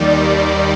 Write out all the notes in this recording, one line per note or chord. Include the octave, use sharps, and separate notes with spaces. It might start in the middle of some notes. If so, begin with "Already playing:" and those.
Already playing: D#2 D#3 G3 D5